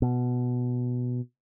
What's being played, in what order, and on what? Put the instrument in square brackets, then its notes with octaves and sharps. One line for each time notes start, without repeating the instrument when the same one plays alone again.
[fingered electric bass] B2